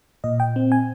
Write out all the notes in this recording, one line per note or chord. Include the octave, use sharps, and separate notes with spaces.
A#2 D#5
G5
C4
G#5